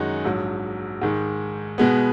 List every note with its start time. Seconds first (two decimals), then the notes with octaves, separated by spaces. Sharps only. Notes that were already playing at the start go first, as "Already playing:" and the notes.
Already playing: F#2 D#3 G#3 D#4 F#4
0.25 A#1 G#2 F#3
1.01 G#2 D#3 G#3
1.78 B2 G#3 B3